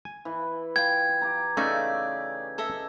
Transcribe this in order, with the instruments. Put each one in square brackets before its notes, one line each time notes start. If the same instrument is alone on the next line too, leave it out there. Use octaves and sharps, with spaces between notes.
[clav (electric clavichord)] G#5
[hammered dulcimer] E3
[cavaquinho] F4 G5 [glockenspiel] G#6
[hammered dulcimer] G4 A#5
[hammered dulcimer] C#3 [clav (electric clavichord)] A3 C#4 D#4 [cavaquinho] D5 E5
[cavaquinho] A4 D#5 E5